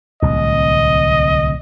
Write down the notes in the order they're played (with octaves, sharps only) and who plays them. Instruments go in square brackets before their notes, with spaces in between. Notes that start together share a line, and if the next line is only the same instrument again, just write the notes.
[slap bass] D1 C2 [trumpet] D#5